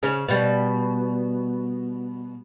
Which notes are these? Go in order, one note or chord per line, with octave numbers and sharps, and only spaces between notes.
C#3 C#4
B2 G3